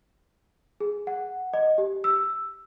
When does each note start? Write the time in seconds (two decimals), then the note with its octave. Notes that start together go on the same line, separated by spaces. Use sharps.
0.80 G#4
1.07 F#5
1.53 D#5
1.78 G4
2.04 E6